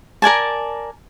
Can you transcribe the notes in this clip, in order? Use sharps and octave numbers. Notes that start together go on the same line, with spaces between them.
A#4 D5 G#5 A5